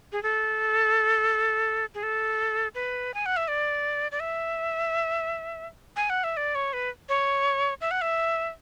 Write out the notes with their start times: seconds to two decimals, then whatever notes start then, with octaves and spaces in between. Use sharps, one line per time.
0.12 G#4
0.23 A4
1.95 G#4
2.03 A4
2.75 B4
3.14 G#5
3.26 F#5
3.37 E5
3.48 D5
4.12 D5
4.20 E5
5.96 G#5
6.10 F#5
6.24 E5
6.37 D5
6.55 C#5
6.73 B4
7.09 C#5
7.81 E5
7.91 F#5
8.01 E5